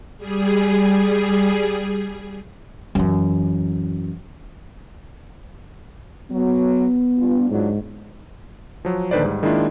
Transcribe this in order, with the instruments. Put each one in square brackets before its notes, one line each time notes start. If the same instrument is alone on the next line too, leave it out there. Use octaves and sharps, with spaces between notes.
[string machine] G3 G#4
[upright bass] F#2 E3
[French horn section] F#3 [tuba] B3
[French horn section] G2 F4
[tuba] G#2 [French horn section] F#3 D4 F4
[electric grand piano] F3 F#3
A#1 D3 D#3 B4 C5 D5
G#2 G3
D#3 G#3 A#3 D4 E4 F4